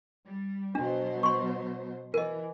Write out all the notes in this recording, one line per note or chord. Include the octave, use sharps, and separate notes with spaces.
G3
B2 F#3 D4 C5
C6 C#6
E3 A#4 D#5